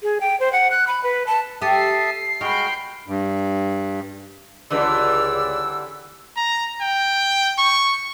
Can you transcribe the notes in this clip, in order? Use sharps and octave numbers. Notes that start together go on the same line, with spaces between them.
G#4
G5
C5
F#5
F#6
B5
B4
A5
G4 A4 E5 D#6 C7
G#3 D#4 F#4 G5 B5 F6
G2
C#2 D3 E3 G3 D5 E6
A#5
G5
C#6